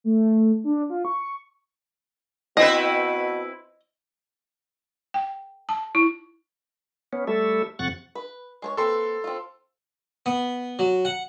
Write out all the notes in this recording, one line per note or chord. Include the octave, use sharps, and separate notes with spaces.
A3
D4
F4
C#6
B2 C4 E4 B4 D#5
G5
A5
E4
B3 C#4
G3 A3 A4 E5
F2 C3 F#5 C#6 F#6 A6
B4
G#3 C5 C#5
A#3 C4 A4 B4 C6
C4 F4
B3
F#3
F#5